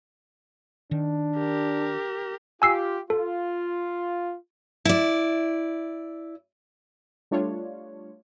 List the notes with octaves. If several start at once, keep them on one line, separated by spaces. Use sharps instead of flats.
D#3 D4
G4 A#4
F4 G4 G#5 E6 C7
F4 A4
E4 D5
G3 A3 D4 F4 C#5